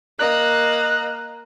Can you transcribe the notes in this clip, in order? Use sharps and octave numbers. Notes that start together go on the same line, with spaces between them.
A#3 D#5 F#6